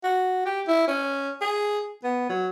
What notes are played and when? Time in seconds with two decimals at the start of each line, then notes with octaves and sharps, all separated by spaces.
0.03 F#4
0.45 G4
0.67 E4
0.87 C#4
1.41 G#4
2.04 B3
2.29 F#3